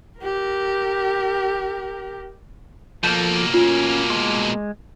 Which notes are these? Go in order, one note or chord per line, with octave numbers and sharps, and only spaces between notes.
G4 A#4
B2 F3 A#3 A4 G6
C#4 F4
G#3 C6 D6